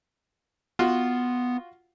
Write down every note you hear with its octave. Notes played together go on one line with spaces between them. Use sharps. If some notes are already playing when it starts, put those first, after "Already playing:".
B3 F4 F#4